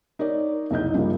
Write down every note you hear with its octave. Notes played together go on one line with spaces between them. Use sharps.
D#4 A#4 C#5 D5
F#1 C2 D#4 D#5 G6
G2 C#3 F3 G3 A#3